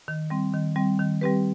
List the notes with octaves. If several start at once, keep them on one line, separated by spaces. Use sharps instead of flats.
D#3
G3 C4
D#3
G3 C4
D#3
G3 C4 G4 B4